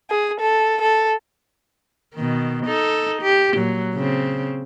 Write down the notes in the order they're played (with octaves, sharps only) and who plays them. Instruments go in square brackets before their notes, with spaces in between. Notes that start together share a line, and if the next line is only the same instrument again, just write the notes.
[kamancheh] G#4
A4
A4
[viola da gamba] B2 D#3
D#4 A4
G4
A#2 F#3
C#3 C4